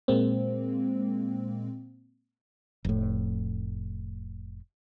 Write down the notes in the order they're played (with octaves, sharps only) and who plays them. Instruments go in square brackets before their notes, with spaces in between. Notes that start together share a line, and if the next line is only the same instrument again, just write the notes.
[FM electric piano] A#2 G#3 A#3 C4
[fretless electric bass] F1 A2